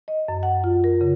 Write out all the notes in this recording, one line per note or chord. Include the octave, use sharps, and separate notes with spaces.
D#5
F#2
F#5
F4
A#4
C#3